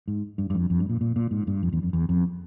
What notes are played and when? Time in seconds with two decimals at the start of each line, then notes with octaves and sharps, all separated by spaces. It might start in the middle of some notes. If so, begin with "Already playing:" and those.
0.08 G#2
0.38 G2
0.50 G2
0.55 F2
0.70 F2
0.80 G2
0.90 A#2
1.01 A#2
1.16 A#2
1.31 G#2
1.47 G2
1.63 F2
1.73 E2
1.83 F2
1.93 E2
2.09 F2